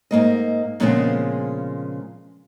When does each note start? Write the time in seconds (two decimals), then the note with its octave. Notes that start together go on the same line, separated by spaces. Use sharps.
0.11 G#2 A#3 D#5
0.80 A#2 C#3 F3 G#3 B3 C4